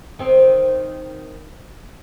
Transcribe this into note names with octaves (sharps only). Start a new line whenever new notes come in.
D#3 C4